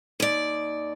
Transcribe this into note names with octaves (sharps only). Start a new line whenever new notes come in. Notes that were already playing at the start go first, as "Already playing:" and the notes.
D#2 D5